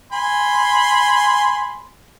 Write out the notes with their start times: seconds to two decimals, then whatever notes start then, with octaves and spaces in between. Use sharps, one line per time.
0.12 G#5 B5 C6